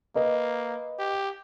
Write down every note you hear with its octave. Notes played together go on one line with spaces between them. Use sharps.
A#3 B4 D#5
G4